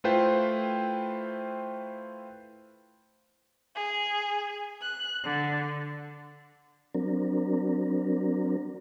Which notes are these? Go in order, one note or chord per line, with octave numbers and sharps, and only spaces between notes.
A3 E4 F4 B4 C5 G5
G#4
F#6
D3
F#3 C4 D4 A#4